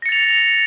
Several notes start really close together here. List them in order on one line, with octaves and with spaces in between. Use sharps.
A#6 C#7 A6 F7